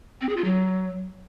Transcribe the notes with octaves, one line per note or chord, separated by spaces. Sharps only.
C4
G#4
F4
F#3